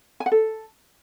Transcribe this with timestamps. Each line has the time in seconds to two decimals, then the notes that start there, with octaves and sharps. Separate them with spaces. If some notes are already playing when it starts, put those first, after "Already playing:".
0.20 G#5
0.26 F#5
0.32 A4